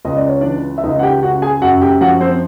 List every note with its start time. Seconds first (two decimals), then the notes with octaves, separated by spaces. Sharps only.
0.05 C#2 D#5
0.17 D5
0.29 C#5
0.41 E3 D4 D5
0.78 E5
0.83 C#2 D#4 D#5
0.99 F#5
1.03 G4 G5
1.22 C#3 F#4 F#5
1.42 G#4 G#5
1.62 F#2 F#4 F#5
1.81 G4 G5
2.01 F3 F#4 F#5
2.21 C4 C5